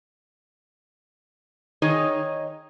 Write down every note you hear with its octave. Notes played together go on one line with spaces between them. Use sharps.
D#3 D#4 G#4 C#5 D#5